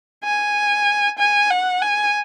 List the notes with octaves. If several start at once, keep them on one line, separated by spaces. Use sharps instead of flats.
G#5
G#5
F#5
G#5